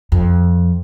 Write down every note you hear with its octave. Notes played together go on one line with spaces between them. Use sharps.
F2